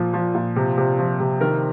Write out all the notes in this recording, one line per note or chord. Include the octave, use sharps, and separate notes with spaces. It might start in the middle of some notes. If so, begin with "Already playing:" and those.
Already playing: A#2 F3
F3
A#2
C3
C3
F3
C3
D#3 A#4